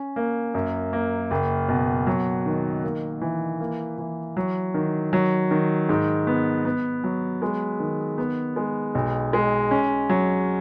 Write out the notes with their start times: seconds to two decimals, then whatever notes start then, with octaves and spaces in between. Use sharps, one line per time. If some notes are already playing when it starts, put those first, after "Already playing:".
Already playing: C#4
0.16 A#3
0.55 F#2
0.93 A#3
1.31 F#1
1.69 B2
2.07 F#3
2.46 D#3
2.83 A#3
3.21 E3
3.60 A#3
3.98 E3
4.37 F#3
4.74 D#3
5.13 F#3
5.51 D#3
5.89 G#2
6.27 B3
6.65 B3
7.04 F#3
7.42 G#3
7.80 D#3
8.18 B3
8.56 G#3
8.95 B1
9.33 G#3
9.71 C#4
10.09 F#3